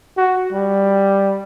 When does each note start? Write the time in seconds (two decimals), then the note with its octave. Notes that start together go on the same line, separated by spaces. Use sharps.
0.17 F#4
0.53 G3